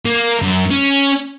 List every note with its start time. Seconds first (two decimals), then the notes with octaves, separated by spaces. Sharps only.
0.06 A#3
0.42 F#2
0.71 C#4